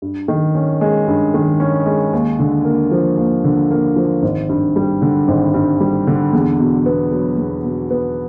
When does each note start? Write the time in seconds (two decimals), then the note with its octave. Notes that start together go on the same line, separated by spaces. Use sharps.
0.02 G2
0.28 D#3
0.55 C#4
0.81 G#3
1.07 G2
1.34 D#3
1.60 C#4
1.86 G#3
2.13 D#2
2.39 D3
2.65 A#3
2.91 F3
3.17 D#2
3.44 D3
3.71 A#3
3.96 F3
4.23 G#1
4.49 G2
4.76 G3
5.02 D3
5.28 G#1
5.54 G2
5.80 G3
6.07 D3
6.33 E2
6.60 B2
6.86 B3
7.12 F#3
7.38 E2
7.65 B2
7.90 B3